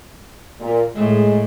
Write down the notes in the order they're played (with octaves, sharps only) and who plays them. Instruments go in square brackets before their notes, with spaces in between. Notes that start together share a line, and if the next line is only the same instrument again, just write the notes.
[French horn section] A#2
[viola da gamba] A2 [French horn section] G#3